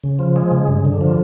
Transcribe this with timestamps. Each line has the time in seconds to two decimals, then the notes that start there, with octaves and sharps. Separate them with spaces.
0.04 C#3
0.19 F3
0.36 G#3
0.51 C#3
0.68 G2
0.85 D3
1.01 F3